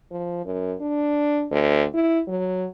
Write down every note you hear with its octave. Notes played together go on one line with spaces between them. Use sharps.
F3
F#2
D4
D2
E4
F#3